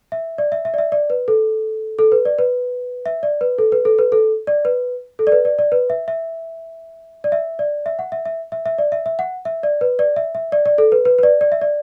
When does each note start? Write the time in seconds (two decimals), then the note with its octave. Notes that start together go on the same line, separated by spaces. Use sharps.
0.12 E5
0.38 D5
0.52 E5
0.65 E5
0.74 D5
0.78 E5
0.92 D5
1.10 B4
1.28 A4
1.99 A4
2.12 B4
2.25 D5
2.39 B4
3.06 E5
3.23 D5
3.41 B4
3.58 A4
3.72 B4
3.85 A4
3.99 B4
4.12 A4
4.47 D5
4.65 B4
5.19 A4
5.27 D5
5.32 B4
5.45 D5
5.59 D5
5.72 B4
5.90 E5
6.08 E5
7.24 D5
7.32 E5
7.59 D5
7.86 E5
7.99 F#5
8.12 E5
8.26 E5
8.52 E5
8.66 E5
8.78 D5
8.92 E5
9.06 E5
9.19 F#5
9.45 E5
9.63 D5
9.81 B4
9.99 D5
10.16 E5
10.35 E5
10.52 D5
10.66 D5
10.78 A4
10.92 B4
11.05 B4
11.18 B4
11.23 D5
11.41 D5
11.52 E5
11.61 D5